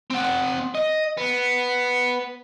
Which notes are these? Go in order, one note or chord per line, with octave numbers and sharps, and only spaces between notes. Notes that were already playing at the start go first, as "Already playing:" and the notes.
C4 F#5
D#5
B3